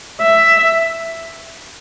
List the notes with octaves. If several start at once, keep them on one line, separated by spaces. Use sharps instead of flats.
E5